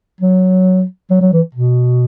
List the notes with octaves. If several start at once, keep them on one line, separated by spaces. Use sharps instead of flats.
F#3
F#3
F#3
E3
B2